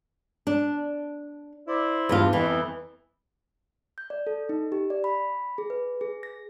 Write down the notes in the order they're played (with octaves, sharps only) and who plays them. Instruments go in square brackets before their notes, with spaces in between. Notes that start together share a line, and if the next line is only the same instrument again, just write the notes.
[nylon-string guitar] D4
[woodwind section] E4 C5 D5
[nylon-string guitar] E2 G2 F4
[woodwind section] F2 [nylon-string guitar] E3
[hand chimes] G6
D5
A4
D#4
G4
D5
B5
G#4
B4
G#4
A#6